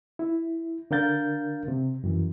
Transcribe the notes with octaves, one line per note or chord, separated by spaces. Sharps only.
E4
D3 D4 A#4 F5 G6 A6
C3
F#2 E3